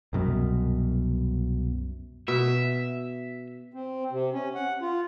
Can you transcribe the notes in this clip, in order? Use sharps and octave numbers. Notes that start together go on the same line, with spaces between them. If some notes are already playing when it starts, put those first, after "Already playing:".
C2 F#2 B2
B2 E5
C4
C3
C#4
F#5
F4